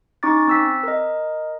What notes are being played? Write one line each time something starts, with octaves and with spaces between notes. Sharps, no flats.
C#4 D#4 C#6 D6 A6
C4 E6 B6
A#4 D#5